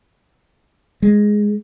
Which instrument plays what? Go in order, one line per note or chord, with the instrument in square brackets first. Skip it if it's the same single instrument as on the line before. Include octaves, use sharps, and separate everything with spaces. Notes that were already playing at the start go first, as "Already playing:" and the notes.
[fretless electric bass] G#3